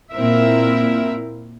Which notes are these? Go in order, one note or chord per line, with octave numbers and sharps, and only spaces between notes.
A#2 C4 E4 A#4 E5